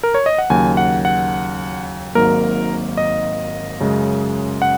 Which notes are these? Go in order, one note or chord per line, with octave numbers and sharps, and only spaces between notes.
A#4
C#5
D#5
F#5
D#2 C#3 F#3 G#5
F#5
F#5
G#1 G#2 F#3 A#3 A#4
D#5
F#2 C#3 G#3
F#5